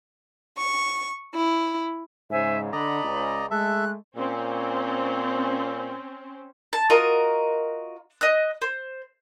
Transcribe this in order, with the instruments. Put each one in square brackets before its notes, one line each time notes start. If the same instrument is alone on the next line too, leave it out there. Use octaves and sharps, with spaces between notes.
[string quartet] C#6
E4
[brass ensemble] G#2 C#3 [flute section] C5 E5 G#5
[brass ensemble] D3 [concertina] D5 D#5 A#5 [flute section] B5
[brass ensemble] C#2
[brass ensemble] G#3 A3 [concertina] A4 E5 [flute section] F#6
[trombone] A#2 [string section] C4 C#4
[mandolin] A5
F4 F#4 A#4 D#5
D#5 F#6
C5